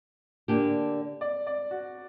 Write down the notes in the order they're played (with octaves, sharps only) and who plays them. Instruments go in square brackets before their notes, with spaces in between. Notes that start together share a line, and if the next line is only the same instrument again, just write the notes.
[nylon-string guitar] D3 A#3 D4 G4
[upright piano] D5
D5
F#4